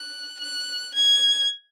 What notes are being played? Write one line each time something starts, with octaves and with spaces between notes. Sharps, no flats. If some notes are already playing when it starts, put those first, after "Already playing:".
Already playing: F#6
F#6
G#6